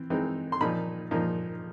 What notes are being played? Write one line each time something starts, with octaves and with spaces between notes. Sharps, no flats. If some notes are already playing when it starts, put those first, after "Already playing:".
Already playing: E3 C4
E3 G#3 C4 D#4
C6
A#2 F3 A#3 D#4 B5
A#2 F3 A#3 D#4